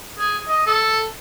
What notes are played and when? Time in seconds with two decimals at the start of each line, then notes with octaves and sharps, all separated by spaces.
0.18 G#4
0.48 D#5
0.66 A4